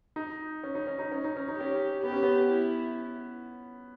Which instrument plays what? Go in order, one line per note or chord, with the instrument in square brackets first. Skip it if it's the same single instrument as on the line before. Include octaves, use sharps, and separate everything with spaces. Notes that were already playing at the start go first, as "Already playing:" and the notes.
[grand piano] D#4
C#4
D#4
C#4
D#4
C#4
D#4
C#4
D#4
[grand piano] C#4 [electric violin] G4
[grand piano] B3 [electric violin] G4
[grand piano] C#4
B3
[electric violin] E4